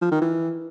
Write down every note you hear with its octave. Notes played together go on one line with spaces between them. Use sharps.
F3
D#3
E3